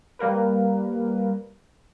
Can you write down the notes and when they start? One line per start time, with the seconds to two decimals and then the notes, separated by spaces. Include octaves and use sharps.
0.19 G3 A#3 A#4 B4